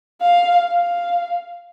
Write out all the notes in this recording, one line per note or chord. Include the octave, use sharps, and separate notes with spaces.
F5
F5